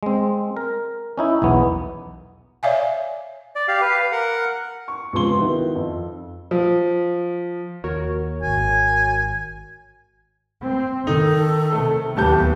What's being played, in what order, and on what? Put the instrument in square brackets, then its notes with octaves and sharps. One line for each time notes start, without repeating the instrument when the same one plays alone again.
[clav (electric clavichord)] G#3 C4
A#4
C#4 D#4 E4
B1 E2 B3
[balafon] C#5 D5 E5 F5 G#5
[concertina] D5
G4 F5
B4 F5
A#4 F#5
[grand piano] C#6
C#2 C3 F3 B3 C6 G7
D#3 B3 E4 F#4
F2
[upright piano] F3
[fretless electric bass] D#2 [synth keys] F#4 A#4 C#5
[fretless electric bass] D1 G#1 [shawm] G#5
[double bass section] C4
[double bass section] D#3 [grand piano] D#4 [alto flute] A4
[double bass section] C3 D#3 [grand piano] A3
[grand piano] D1 A5 G6 [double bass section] D#2 B3 [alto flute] G4